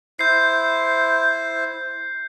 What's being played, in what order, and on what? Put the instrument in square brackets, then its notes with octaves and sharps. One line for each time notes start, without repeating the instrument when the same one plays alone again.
[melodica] E4 C5 [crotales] G6 C7